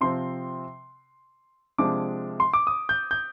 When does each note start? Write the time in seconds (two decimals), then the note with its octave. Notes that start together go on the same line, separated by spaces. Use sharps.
0.01 C3 F3 C4 C6
1.78 C3 F3 G#3 D4 D6
2.40 C6
2.53 D6
2.67 D#6
2.89 G6
3.11 G6